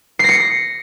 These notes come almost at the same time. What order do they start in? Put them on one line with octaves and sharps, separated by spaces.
C7 A#6 C#7